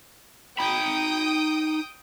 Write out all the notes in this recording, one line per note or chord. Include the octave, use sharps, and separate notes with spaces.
D#4 G5 B5 D#6